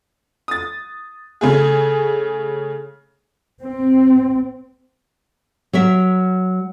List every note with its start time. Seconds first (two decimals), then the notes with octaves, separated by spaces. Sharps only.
0.48 D#6 A6
1.41 C#3 A3 G#4
3.62 C4
5.73 F#3 A#4 E5